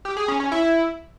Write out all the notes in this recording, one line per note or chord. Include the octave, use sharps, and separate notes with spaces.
G4
G#4
C#4
C#4
E4